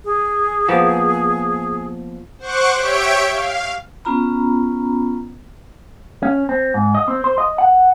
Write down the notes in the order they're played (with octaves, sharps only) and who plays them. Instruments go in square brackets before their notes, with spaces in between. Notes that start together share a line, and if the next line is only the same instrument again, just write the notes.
[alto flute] G#4
[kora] F3 A#3 B3
[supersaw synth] C5 F#5 C#6 D6 F#6
G4 C#5 E5 G5 D7
F5
[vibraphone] B3 C#4 F4 A#5 B5
[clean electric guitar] C#4
C4
G#2
D#5
C4
C5
D#5
F#5